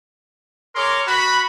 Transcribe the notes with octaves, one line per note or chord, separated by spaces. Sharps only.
G#4 A#4 C#5 C6 D6
F#4 B5